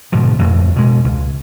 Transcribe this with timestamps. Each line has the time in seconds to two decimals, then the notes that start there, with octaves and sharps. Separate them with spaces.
0.12 G#2 B2 D3 F3
0.39 A1 F2
0.76 B2 G#3
1.04 C#2